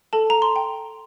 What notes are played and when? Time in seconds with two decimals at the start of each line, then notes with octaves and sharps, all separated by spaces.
0.13 A4 A5
0.30 A#5
0.42 C6
0.56 G5